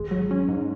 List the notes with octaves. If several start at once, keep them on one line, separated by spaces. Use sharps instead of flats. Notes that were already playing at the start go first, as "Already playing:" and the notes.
Already playing: G#1 G#3
F#3
C#4
G#2